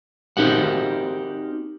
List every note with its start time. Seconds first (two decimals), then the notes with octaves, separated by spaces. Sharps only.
0.37 C4 D#4 F#4 G4 A#4 F#5